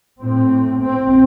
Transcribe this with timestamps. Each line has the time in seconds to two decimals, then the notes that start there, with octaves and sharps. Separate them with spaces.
0.22 A2 C4
0.82 C4